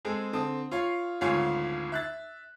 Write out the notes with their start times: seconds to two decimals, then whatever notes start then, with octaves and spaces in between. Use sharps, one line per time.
0.05 G#3 C4 G#4 A4
0.33 D3 C4 A5 D#6
0.71 F4 C#5 F5
1.21 G#1 D2 F4 C#5 G#5
1.92 E5 F#6 A6